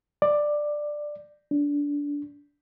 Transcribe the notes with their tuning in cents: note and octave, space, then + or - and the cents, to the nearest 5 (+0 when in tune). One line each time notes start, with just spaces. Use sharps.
D5 +10
D4 -20